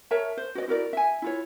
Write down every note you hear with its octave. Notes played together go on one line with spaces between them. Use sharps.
A#4 C#5 E5 A5
C5
F#4 C5 D5 D#5
E4 F#4 A#4 D5
E5 G#5
E4 F4 C#5